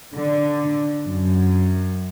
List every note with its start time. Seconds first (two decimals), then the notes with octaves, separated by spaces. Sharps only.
0.13 D3
1.06 F#2